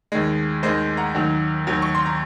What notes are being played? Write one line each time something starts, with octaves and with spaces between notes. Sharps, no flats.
D#2 D#3 G#3
D#2 D#3 G#3 C5 D#5
F#5 A#5
D#2 D#3 F#3
D#2 D#3 F#3
C#6
C6
A#5